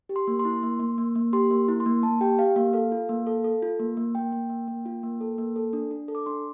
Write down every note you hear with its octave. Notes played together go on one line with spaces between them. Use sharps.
G4
C6
A#3
C6
E4
A#3
A#3
A#3
A#3
G4 C6
A#3
E4
C6
A#3
A#3 A5
G4 G5
G4 F5
A#3 F5
A4 F5
F4
A#3
A4
A4
F4
A#3
A#3
A#3 G5
A#3
A#3
A#3
F4
A#3
A4
A#3
A4
D4
D4
A4
D6
D4 C6